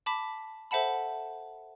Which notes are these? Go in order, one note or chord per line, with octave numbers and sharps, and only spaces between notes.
A5 B5 D6 B6
A4 C5 E5 F#5 A5 B5